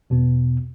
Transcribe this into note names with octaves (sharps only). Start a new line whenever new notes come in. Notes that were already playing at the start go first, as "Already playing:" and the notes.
E2 B2 B3